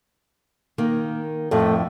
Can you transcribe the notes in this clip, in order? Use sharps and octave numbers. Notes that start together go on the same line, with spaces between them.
D#3 A#3
F2 A2 A3